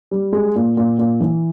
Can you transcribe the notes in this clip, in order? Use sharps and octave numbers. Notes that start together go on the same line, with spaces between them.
G3
G#3
A#2
A#2
A#2
E3